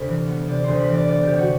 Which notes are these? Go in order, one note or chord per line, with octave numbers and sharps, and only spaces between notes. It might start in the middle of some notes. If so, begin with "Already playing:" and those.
Already playing: D2 C3 B5
E3
B3
C3 D5
D2 C5
B4
E3 D5
B3 D5
G4
C3
F#4